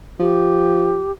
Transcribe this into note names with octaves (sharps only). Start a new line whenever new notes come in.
F3 G4